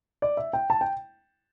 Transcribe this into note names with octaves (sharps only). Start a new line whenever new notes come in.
D5
E5
G5
A5
G5